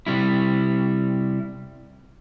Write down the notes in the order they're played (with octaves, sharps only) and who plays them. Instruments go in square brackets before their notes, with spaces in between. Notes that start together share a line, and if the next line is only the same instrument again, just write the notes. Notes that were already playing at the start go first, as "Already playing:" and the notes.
[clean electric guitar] C3 G3 E4